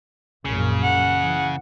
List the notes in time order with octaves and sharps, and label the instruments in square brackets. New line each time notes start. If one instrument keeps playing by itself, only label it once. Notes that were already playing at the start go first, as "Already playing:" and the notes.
[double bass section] A#1 F#2 A#2 [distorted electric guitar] C#3
[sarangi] F#5
[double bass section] E3